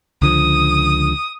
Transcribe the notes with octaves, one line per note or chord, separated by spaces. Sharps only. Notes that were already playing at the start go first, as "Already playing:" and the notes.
C#2 D3 F3 D#6